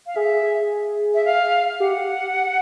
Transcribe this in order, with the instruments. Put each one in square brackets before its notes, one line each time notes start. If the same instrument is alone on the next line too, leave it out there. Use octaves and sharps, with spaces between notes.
[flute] F5
[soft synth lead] G#4 [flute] E5
[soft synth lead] G#4
[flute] E5
F5
[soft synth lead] G4 [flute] F#5